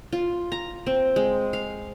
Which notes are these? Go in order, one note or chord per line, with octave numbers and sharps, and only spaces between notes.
F4
A#5
C4
G#3
F5